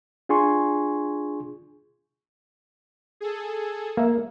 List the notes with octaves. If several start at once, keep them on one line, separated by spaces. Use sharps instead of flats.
D4 F4 G#4 G#5 C6 C#6
G#4 A4
A#3 E5